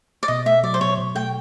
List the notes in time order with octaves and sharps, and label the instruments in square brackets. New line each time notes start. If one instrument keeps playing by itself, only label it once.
[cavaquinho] D5
[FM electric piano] B2 [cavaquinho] D#5
[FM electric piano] A3 [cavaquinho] E5
[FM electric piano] F#3 [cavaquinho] D5
[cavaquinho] C5
[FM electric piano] B2 [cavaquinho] C#5
[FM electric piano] B2
[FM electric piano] A3 [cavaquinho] G5